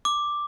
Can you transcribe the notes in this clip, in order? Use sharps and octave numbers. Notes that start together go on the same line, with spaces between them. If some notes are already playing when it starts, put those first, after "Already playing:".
D6